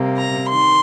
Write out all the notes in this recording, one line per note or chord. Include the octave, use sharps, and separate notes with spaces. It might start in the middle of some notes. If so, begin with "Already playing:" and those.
Already playing: C3 G3 A#3
A#5
D#3 C6